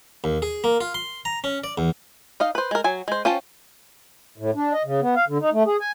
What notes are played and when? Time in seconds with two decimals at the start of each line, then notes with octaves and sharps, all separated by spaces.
0.24 D#2
0.42 G#4
0.64 A#3
0.81 F4
0.94 C6
1.25 A#5
1.44 C#4
1.64 D5
1.78 E2
2.40 D#4 D#5 F5
2.55 B4 C5
2.71 G#3 A#4
2.84 F#3 G#5
3.08 G#3 C5
3.25 C#4 F4 C5 G5 A5
4.38 A2
4.56 D4
4.73 D#5
4.85 C#3
5.01 B3
5.16 F5
5.28 D3
5.41 D#4
5.53 A3
5.66 G#4
5.81 G#5